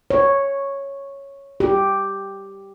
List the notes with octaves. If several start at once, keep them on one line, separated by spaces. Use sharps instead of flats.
C#5
G4